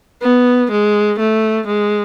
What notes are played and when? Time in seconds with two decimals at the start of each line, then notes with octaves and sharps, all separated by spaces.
0.22 B3
0.71 G#3
1.19 A3
1.68 G#3